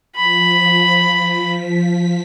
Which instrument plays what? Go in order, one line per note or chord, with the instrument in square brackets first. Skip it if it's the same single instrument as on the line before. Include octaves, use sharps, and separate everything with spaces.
[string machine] F3 B6 [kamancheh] B5